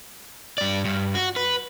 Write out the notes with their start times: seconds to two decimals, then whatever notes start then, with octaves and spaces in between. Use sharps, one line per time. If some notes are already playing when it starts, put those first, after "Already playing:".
0.58 G2 D5
0.85 G2
1.15 F#4
1.36 B4